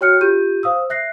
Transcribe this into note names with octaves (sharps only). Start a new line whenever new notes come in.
F#4 C#5 G5 F6 F#6 C#7
F4 G4 G6 D#7
C5 F5 D#6 E6
E5 F#6 A#6 C7